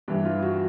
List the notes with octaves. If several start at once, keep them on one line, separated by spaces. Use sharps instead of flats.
G2 E3 D4
F4
F#4